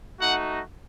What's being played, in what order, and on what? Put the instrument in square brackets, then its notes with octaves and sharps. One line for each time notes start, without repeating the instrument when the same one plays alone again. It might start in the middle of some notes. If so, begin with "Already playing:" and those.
[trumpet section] A3 D#4 F#4 F#5